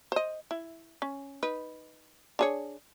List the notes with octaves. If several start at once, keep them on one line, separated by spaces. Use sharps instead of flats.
C5 D#5
E4
C#4
D#4 B4
D4 G#4 C#5